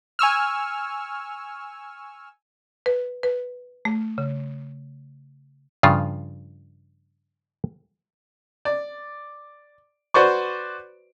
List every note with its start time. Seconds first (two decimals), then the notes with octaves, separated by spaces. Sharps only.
0.19 G#5 C#6 E6 F6
2.86 B4
3.23 B4
3.85 A3
4.18 C#3
5.83 G2 C#3 F3 F4
8.65 D5
10.14 F#4 B4 C5 D5 C#6